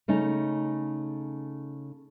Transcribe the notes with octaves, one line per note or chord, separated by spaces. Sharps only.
C#3 A3 C#4 D#4